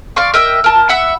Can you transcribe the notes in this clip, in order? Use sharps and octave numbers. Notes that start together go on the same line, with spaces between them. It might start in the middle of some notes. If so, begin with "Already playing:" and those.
D5 F5 C6 C#6
A#4 D#5 E5 G5
A#4 A5
E5 F#5 B5